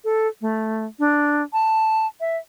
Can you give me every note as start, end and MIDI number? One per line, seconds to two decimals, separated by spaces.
0.04 0.28 69
0.41 0.85 57
0.99 1.43 62
1.53 2.07 81
2.20 2.37 76